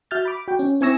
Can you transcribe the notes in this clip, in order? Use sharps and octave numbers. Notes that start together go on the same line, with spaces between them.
F#4 E5 F6 G6 A6
B5 D6
F#4 G5
C#4
C4 E4 G#5 C#6 E6 A#6